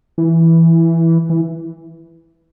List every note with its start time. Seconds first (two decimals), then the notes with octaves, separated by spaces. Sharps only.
0.18 E3
1.30 E3